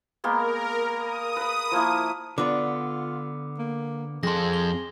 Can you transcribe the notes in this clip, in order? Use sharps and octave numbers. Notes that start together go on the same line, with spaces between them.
G#3 A#3 B3 A#4
D#6
B4 B5
F3 A#3 E4
D3 B3 F4 D5 D6
A#3
F2 G#4 A4 C6 A#6
G7